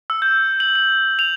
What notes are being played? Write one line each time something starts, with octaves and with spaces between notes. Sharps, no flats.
E6
G6
F#7
F#7
F7